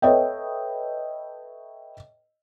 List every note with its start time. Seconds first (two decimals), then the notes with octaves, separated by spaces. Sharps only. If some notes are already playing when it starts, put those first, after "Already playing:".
0.02 A4 B4 C#5 D#5 E5 G5